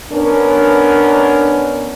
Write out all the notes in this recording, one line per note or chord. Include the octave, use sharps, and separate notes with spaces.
B3 C#4 D4 A#4